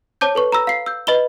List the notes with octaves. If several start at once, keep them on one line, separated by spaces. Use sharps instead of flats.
C5 C#5 A5 D6 G6
A4 B4 C#6
A#5 B5 E6 A#6
F5 C7
E6 G6
B4 D#5 B5 G7